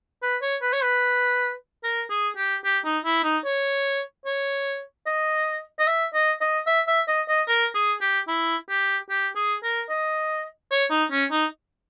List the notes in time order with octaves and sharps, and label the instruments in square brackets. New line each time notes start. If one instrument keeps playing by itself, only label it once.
[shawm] B4
C#5
B4
C#5
B4
A#4
G#4
G4
G4
D#4
E4
D#4
C#5
C#5
D#5
D#5
E5
D#5
D#5
E5
E5
D#5
D#5
A#4
G#4
G4
E4
G4
G4
G#4
A#4
D#5
C#5
D#4
C#4
D#4